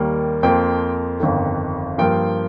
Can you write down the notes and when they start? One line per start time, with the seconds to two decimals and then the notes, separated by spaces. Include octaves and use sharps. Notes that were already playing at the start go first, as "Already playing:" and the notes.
Already playing: D#2 D#3 G3 A#3
0.43 F2 F3 A#3 G5
1.20 G1 F2 D#3
1.98 G2 F3 A#3 G5